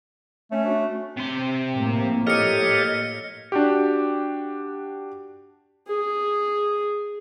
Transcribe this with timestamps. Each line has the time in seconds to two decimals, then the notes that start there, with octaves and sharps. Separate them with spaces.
0.52 A3 C#4
0.65 C#4 D4 F#4
1.17 C3 C6
1.73 A2 F3 A#3
2.27 G4 A4 C#5 D#5 F6 C#7
3.52 D4 F#4 G4
5.88 G#4